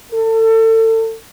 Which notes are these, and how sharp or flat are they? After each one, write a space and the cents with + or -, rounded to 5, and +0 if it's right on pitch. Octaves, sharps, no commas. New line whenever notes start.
A4 +30